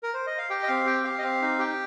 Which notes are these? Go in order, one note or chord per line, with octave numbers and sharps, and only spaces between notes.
A#4
C5
D#5
F5
G4 G5
D#5
C4 F5
G4 G5
G4 F5
D#5
C4 F5
D#4
G4 G5